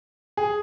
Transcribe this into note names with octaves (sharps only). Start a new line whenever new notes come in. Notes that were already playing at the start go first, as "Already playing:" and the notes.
G#4